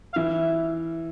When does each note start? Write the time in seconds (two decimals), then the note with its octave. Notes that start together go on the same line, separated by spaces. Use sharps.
0.13 F5
0.16 E3 E5